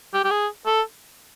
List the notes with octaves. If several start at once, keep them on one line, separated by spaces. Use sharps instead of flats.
G4
G4
G#4
A4